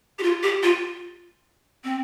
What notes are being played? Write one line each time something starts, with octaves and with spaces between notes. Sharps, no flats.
G4
F4
G4
F4
C4